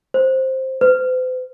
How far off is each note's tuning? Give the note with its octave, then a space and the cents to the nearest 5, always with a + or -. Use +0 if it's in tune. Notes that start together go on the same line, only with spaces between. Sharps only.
C5 +10
C5 -45